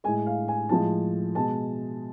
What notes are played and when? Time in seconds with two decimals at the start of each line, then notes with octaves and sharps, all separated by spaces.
0.04 G#3 G#5
0.08 A2
0.26 F5
0.48 G#5
0.69 A2 F3 G#3 A5
1.35 B2 G#3 A5